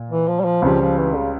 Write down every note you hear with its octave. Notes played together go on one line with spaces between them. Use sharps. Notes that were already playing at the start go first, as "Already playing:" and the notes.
Already playing: A#2
E3
F3
G3
F3
C#2 C#3 F3 G3
F3
E3
C#3